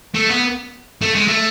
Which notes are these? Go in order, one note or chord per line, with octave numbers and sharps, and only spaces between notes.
A3
B3
A3
G#3
A3